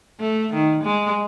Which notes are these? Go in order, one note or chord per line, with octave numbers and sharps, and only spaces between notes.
A3
D#3
G#3